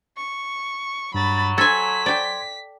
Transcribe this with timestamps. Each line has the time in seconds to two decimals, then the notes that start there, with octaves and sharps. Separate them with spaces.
0.17 C#6
1.14 G2 F#3 B5 A6
1.58 A4 G#5 C6 G#6 B6
2.06 D5 G5